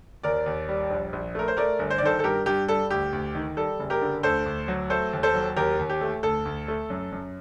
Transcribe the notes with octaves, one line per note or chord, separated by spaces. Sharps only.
D#2 A#4 D5
D#2
G3
A#1
A#1
A3 A#4
C5
A3 A#4 D5
G1
C5
D5
D#3 A4 C5
A4
G2 G4 A#4
G2 G4
G3 A4
D2 G4
D2
D#3
G3 A4
F#1
G4 A#4
D3
D2 A4 C5
D2
F#3
A3 A4 C5
D#2
A4 C5
F#3
D#2 G4 A#4
D#2
G4
A3
D2 A4
D2
A3
F#2
F#2